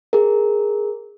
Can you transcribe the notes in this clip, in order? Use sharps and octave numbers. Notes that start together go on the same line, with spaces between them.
G#4 A#4